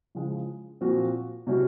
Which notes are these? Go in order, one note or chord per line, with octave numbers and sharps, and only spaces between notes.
C#3 F3 G#3
A#2 F3 C4 F#4
C3 F#3 C#4 F#4